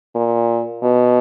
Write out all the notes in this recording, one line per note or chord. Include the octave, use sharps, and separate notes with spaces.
A#2
B2